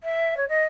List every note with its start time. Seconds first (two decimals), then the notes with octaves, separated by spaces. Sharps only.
0.03 E5
0.37 C#5
0.48 D#5